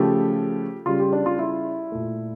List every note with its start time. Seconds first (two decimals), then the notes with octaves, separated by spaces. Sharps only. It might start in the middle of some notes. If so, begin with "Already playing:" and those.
Already playing: C#3 F3 A3 G4
0.86 C#3 G3 F4
1.00 G4
1.13 D4
1.26 F4
1.39 E4
1.92 A#2 A3